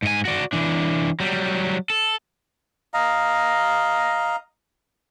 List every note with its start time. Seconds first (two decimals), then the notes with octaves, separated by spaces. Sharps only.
0.03 G#2 G#5
0.25 F#4 D5
0.53 E3 D4
1.20 F#3 G3
1.90 A4
2.94 D#5 F5 A#5